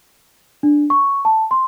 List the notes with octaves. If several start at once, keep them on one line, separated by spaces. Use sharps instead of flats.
D4
C#6
A5
C6